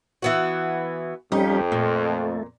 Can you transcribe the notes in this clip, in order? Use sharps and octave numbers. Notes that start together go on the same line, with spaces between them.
E3 B3 F#4
F2 G3 C#4 D#4 G4
A#2 A3